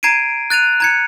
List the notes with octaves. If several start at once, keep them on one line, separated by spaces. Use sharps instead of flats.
A#5 G#6 C7 D7 D#7
F#6 A6 D#7 F7
A#5 G#6 C#7